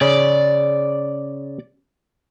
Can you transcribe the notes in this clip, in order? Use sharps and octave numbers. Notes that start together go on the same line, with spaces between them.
C#3 C#4 D5